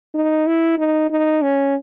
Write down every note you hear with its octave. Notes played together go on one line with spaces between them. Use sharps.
D#4
E4
D#4
D#4
C#4